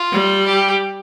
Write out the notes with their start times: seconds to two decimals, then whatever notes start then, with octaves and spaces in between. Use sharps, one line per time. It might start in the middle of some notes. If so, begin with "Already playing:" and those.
Already playing: F4
0.12 G3
0.47 G4